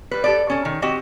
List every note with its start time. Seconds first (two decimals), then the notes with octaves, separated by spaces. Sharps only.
0.11 G3 B4
0.24 G4 A4 D5
0.50 C#4 A4
0.65 D#3
0.82 C4 F#4 G4 D#5